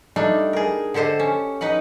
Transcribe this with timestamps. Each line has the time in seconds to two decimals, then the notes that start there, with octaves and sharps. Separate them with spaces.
0.16 G3 A3 D4 D#4
0.53 G#4 A#4
0.94 D3 G4 A4 C5 D#5
1.20 C#4
1.61 D#4 B4 D#5 F#5